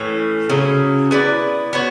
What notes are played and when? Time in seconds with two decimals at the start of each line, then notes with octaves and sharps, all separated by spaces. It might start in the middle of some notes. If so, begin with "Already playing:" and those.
Already playing: A2 E3 C#4
0.49 C#3 F#3 C#4 E4
1.11 B3 E4 B4 D5
1.73 B3 F#4 C#5